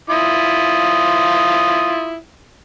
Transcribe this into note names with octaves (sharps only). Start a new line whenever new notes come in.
E4 F4 D#6